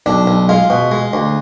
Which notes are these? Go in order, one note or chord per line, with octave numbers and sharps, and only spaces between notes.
B1 D4
B1
G#3 F4
B2
G#3
D2